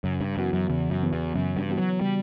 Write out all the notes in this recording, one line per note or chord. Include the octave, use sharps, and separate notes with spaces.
F#2 C#3
G2
F#2 E3 B3 F#4
F#2
E2 C#3
F#2
E3 B3 F#4
E2
F#2 C#3
G2
E3 B3 F#4
F#3
C#3 G3